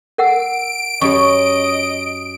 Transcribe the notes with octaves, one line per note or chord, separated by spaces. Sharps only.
A#4 F#5 E6 D7
F#2 G4 D#5 C#6